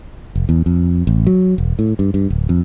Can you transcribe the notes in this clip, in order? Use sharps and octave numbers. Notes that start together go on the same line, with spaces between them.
F1
E2
F2
A1
F#3
E1
A2
G2
G2
D1
F2